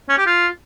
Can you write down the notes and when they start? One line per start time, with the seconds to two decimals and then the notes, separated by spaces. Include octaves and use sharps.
0.09 C#4
0.18 G4
0.27 F4